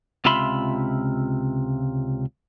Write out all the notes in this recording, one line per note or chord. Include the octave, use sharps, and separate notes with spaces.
C#2 C3 F4 E5 B5 C6